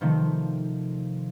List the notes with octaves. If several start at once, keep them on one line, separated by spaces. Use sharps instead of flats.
C3 D#3 F3 A3 C4